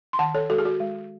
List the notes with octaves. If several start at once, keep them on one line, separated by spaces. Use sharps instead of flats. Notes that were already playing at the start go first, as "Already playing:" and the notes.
C6
D#3 F#5 A5
A4 C#5
G#3 F#4 A4
G#4
F#4
G#3